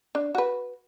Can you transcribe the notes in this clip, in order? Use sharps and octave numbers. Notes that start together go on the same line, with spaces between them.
D4
F#4 B4